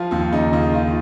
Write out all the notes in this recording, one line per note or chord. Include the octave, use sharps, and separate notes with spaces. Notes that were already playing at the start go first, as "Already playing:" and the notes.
Already playing: F3 F4
D#2 F4
C#3 D#4
D#2 F4
D#3 F4